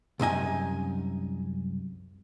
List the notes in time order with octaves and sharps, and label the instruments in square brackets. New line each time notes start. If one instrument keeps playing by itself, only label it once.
[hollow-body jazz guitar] C2 F#2 D#4 G#5